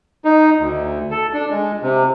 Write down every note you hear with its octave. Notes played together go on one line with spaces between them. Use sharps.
D#4
D2
A4
D4
G#3
C3